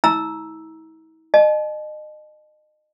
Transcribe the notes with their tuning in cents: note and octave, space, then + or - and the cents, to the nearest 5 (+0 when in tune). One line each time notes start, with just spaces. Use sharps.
E4 -45 A#5 +15 E6 +0
D#5 -30 A5 -45